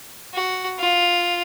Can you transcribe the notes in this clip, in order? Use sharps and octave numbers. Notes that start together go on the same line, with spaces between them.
F#4
F4